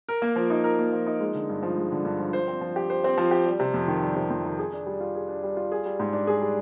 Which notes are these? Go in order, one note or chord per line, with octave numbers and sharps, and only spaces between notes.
A#4
A#3
F3
D#4
A#4
A#3
F3
D#4
G#3
D3
G2
F3
G#3
D3
G2
F3
C5
C4
F3
G4
C5
C4
F3
G4
G3
C3
F2
D#3
G3
C3
F2
D#3
G#4
D4
G3
F4
G#4
D4
G3
F4
G#4
G3
G#2
D4
G#4
G3